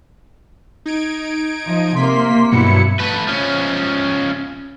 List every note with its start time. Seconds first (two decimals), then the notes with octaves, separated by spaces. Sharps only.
0.86 D#4 G#6 D7
1.66 F3 D#5
1.96 C3 A#3 C6 B6
2.52 G2 B2 F#3 E4 C#7
2.99 A3 B4
3.28 F3 C#4